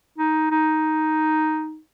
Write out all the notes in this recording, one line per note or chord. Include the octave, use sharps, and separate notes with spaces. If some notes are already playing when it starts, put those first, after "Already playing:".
D#4
D#4